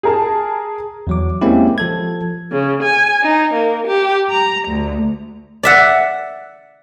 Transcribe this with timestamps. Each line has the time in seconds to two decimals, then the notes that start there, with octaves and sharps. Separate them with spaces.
0.03 G#4 A#4 A5
1.07 E2 F#3 D6
1.41 G#3 A#3 C4 C#4 E4 G4
1.78 F3 A4 G#6
2.51 C#3
2.83 G#5
3.24 D#4
3.54 A#3
3.87 G4
4.30 A#5
4.68 D2
5.63 D5 E5 F#5